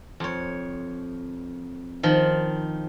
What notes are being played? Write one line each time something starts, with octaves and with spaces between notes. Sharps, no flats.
F2 C#5
D#3 F3